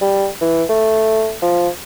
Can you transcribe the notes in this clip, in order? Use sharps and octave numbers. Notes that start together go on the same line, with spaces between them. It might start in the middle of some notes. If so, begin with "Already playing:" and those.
G3
E3
A3
F3